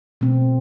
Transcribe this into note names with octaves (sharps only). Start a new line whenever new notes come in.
B2 A3 C4